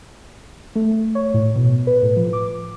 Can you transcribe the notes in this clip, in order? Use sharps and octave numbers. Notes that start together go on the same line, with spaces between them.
A3
C#5
A2
B2
B4
A2
F3
D6